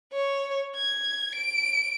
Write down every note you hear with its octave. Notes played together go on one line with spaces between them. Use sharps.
C#5
G#6
D7